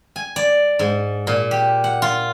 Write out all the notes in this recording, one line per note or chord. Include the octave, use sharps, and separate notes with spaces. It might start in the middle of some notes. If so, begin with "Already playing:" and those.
G#5
D5
G#2
A#2
G4
F#5
F4